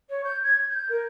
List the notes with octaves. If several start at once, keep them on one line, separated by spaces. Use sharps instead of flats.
C#5
G6
G#6
G6
A#4